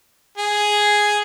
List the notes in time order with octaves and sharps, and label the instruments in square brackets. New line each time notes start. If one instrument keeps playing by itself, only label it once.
[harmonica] G#4